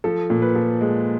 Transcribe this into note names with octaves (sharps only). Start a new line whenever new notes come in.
F3 A4
A#2
B4
F3
G#3